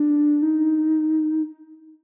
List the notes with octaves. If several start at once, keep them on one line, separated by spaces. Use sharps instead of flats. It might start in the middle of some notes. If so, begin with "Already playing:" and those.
Already playing: D4
D#4